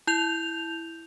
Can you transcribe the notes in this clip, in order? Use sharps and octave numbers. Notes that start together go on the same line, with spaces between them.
E4 G6 F7